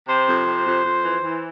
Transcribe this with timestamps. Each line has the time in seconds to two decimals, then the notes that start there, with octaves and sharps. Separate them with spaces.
0.07 C3 C5
0.27 F2
0.47 C3
0.65 F2
0.84 F2
1.04 E3
1.22 E3